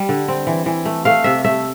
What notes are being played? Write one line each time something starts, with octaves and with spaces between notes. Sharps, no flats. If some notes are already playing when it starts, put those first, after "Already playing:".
Already playing: G3
D3
C4
E3
E3
A3
A3 F5
C3 E5
A3 E5